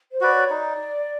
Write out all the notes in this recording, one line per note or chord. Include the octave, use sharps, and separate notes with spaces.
C5
F#4 B4 D5
C#5
D#4 D5